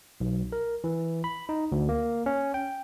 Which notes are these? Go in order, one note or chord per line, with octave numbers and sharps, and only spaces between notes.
B1
A#4
E3
B5
D#4
D2
A#3
C#4
G5